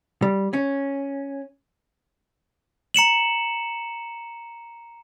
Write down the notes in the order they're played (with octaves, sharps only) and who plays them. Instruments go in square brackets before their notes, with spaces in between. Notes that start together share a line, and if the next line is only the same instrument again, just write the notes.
[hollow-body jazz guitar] G3
C#4
[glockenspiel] A#5 C#7 E7 F#7